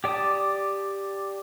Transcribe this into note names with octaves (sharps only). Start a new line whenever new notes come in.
G4 D5 A5 D#6